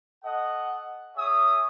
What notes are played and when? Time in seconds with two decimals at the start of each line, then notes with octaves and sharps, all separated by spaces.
0.24 A4 D#5 F#5
1.16 G#4 C#5 E5 D#6